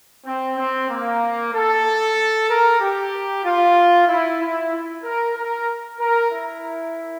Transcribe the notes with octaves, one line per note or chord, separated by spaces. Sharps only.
C4
C4
A#3
A4
A#4
G4
F4
E4
E4
A#4
A#4
A#4
E4